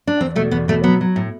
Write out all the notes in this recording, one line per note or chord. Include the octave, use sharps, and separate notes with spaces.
D4
E2 C4
B2 A3
E2 B3
B2 A3
F#3 B3
F#3
A2